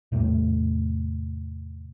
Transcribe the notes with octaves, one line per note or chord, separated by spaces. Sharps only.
E2 A2 C3 A3